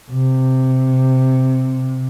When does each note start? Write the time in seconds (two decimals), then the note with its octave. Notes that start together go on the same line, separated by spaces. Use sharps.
0.11 C3